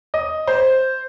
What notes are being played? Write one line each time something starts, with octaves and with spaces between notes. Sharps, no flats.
D#5
C5